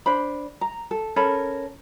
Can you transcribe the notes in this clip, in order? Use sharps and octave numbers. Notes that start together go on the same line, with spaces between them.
D4 C5 B5
A#5
A4
C#4 A4 A#4 B5